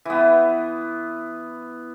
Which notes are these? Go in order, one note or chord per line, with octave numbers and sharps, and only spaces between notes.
E3 B3